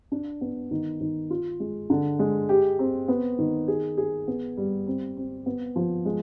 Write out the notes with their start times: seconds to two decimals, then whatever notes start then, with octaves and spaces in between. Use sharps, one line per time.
0.12 D4
0.41 B3
0.71 D#3
1.00 D#3
1.30 F4
1.60 G#3
1.90 D3
2.19 G#3
2.49 G4
2.79 C4
3.08 B3
3.38 D#3
3.68 G#4
3.98 G#4
4.27 B3
4.57 G3
4.87 C4
5.17 C4
5.46 B3
5.76 F3
6.05 G#3